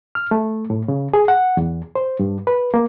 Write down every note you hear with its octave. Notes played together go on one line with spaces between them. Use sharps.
F6
A3
A2
C#3
G#4
F#5
E2
C5
G2
B4
A#3